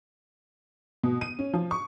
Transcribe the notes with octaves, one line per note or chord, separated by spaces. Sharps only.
B2
D#7
C#4
F3
C#6